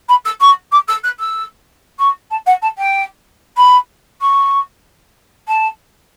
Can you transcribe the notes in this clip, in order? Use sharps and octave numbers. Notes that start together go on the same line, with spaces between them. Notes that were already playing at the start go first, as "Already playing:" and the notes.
B5
E6
C#6
D6
E6
F#6
E6
C#6
A5
F#5
A5
G5
B5
C#6
A5